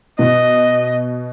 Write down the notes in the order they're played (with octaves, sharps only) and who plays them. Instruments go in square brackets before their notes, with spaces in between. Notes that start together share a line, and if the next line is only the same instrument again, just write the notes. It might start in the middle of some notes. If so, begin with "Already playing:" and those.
[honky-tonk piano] B2 [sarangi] D#5